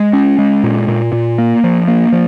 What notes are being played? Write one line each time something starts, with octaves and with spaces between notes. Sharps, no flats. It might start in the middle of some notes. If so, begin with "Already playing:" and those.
Already playing: G#3
C#4
G#3
A#2
A#2
A#2
A#3
F3
A#3
F3